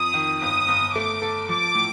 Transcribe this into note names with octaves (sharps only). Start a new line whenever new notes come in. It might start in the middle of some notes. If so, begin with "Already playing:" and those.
Already playing: F2 D#6
D#3
G1 D#6
G1
A3 D6
A4
F3 D6
A2